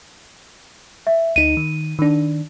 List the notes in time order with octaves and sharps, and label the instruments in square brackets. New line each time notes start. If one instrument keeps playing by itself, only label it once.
[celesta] E5
[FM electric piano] D2 D#4 [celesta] D#7
[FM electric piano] D#3
D#3 D4